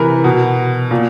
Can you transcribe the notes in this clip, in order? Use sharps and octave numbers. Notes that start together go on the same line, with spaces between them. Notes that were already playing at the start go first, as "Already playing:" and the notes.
Already playing: C3 E3 A#4 B4
B2
A#2